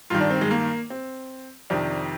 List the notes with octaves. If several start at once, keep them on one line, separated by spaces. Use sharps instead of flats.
G2 D#3 F4
D4
C4
G#3
A#3
C4
F2 C3 D#3 D4